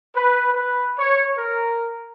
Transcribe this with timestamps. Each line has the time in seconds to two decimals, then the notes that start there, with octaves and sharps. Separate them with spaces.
0.16 B4
0.52 B4
0.96 C#5
1.37 A#4